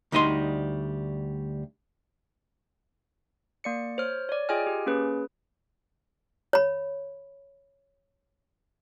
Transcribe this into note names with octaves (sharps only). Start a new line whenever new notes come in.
D2 G3 D#4 D#5 C6
A#3 D5 C#7
C5 C#5 F6
C#5 D5
F4 G#4 D#5 G5 G#5 F6
G4
A#3 C#4 G#4 B4
C#5 B5